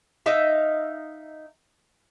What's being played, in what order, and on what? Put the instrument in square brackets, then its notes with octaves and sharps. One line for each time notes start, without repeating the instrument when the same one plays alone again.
[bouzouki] D#4 E5 F5